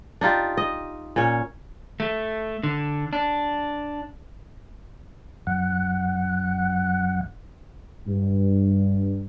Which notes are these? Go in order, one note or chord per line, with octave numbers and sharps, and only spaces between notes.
D4 D#4 F4 G4
D#5
A#2 C#4 C#5
A3
D3
D4
F#2 F#5
G2